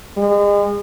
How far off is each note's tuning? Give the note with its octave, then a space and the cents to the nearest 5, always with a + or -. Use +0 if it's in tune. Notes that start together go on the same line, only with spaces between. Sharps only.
G#3 -35